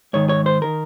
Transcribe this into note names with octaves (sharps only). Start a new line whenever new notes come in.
G#2 D#3 C#5
C#5
C5
D#3 A#4